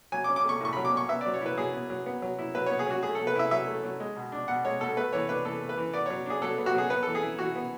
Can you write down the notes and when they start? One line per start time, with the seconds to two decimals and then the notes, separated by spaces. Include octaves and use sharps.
0.12 F#3 G#5
0.24 D6
0.29 C#4
0.36 D6
0.44 A3 C#6
0.60 A2 C#6
0.73 F#3 B5
0.85 D6
0.93 C#4 C#6
1.09 B3 E5
1.21 D5
1.26 F#3
1.34 C#5
1.41 E4 B4
1.58 F#3 G#4
1.73 B3
1.90 F#3
2.06 B3
2.22 F#3
2.39 E4
2.55 F#3 B4
2.66 B3 C#5
2.79 G#4
2.87 F#3 F#4
3.03 A3 G#4
3.15 F#3 A4
3.27 B4
3.35 E4 E5
3.51 F#3 E5
3.67 A3
3.83 F#3
4.00 G#3
4.16 B2
4.32 D4
4.48 B2 F#5
4.65 G#3 C#5
4.80 B2 A4
4.97 A3 B4
5.13 E3 C#5
5.29 D4 B4
5.45 E3 A4
5.61 A3
5.69 B4
5.77 E3
5.94 B3 D5
6.06 F#3 C#5
6.26 D4 G#4
6.42 F#3 A4
6.58 B3
6.66 F#4
6.75 F#3 G#4
6.90 B3 B4
7.03 E3 A4
7.15 G#4
7.23 E4
7.39 E3 F#4
7.55 B3